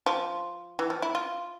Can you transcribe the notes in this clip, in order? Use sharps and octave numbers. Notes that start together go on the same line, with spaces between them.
F3
E3
F3
E4
F4